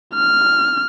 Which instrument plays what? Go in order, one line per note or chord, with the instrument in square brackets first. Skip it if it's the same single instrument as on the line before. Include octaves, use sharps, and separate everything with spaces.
[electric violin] F6